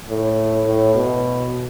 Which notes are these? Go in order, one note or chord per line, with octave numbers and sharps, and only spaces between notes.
A2
A2
B2